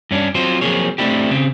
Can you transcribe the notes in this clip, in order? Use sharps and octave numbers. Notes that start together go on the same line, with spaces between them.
G2 C#4 D4
F#3 C4 F4 C5
F3 F#3 A#3 C4 G#4 C#5
A3 C4 D4 E4 G4
C#3 C4